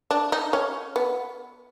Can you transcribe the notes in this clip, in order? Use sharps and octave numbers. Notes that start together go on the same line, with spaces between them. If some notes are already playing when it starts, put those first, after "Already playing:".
D4
D#4
C#4
B3